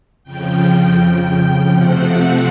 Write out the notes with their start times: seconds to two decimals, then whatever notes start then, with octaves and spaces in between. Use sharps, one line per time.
0.24 F2 C#3 F3 G5
1.71 C3 F3 A3 C4 F#5